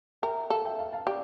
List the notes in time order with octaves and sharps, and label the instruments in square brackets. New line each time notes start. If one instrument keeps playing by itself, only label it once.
[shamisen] A#4 [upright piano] E5 G5
[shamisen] A4 [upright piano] F5 A5
[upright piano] E5 G5
F5 A5
F5 A5
[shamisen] G4 [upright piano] D5 F5